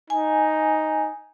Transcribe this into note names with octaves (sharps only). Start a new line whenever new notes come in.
D#4 G#5